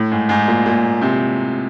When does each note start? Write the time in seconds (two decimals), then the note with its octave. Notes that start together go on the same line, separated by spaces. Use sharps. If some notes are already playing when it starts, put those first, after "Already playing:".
Already playing: A2
0.11 G#2
0.29 G#2
0.47 A#2
0.66 A#2
1.02 C3